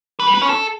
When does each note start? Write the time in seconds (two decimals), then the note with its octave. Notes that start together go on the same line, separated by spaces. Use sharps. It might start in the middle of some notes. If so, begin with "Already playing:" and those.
0.20 B4
0.27 G3
0.34 B4
0.42 C#4
0.49 A4